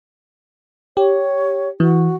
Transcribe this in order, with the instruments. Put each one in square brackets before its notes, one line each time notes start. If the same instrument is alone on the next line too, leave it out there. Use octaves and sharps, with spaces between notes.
[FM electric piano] G4 [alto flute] C#5
[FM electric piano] E3 [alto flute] F#4